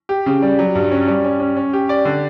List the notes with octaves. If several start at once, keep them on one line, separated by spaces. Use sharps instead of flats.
G4
C#3
G3
F#3
G2
C#4
G3
C#4
C#4
C#4
G4
D5
D3